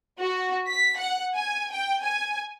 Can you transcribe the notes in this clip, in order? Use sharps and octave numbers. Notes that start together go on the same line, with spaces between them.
F#4
B6
F#5
G#5
G5
G#5